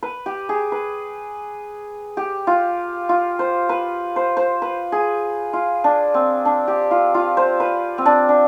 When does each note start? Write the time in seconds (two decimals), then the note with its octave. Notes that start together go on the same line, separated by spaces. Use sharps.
0.03 B4
0.26 G4
0.49 G#4
0.72 B4
2.17 G4
2.47 F4
3.09 F4
3.39 C5
3.69 B4
4.16 C5
4.37 C5
4.62 B4
4.92 G#4
5.53 F4
5.84 D4
6.14 C4
6.45 D4
6.68 G4
6.91 F4
7.14 F4
7.37 C5
7.60 B4
7.98 C4
8.06 D4
8.29 D4